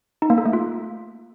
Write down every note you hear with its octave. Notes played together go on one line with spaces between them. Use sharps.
D#4
A#3
A4
A3
F4